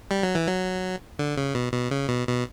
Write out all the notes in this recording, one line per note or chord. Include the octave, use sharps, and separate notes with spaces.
G3
F#3
E3
F#3
D3
C#3
B2
B2
C#3
B2
B2